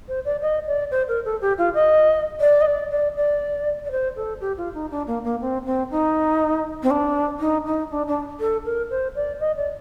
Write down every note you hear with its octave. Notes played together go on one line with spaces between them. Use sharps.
C5
D5
D#5
D5
C5
A#4
A4
G4
F4
D#5
D5
D#5
D5
D5
D5
D5
C5
A4
G4
F4
D#4
D4
A#3
A#3
C4
C4
D#4
C4
D4
D#4
D#4
D4
D4
A4
A#4
C5
D5
D#5
D5